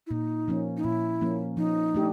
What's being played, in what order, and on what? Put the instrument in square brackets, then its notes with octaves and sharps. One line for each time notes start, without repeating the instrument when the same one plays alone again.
[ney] E4
[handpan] A#2 [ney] D#4
[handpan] F3 A#3 C#4
[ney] D#4
[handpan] A#2 [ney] E4
[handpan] F3 A#3 C#4
[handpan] F3 [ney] D#4
[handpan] A3 D4 G4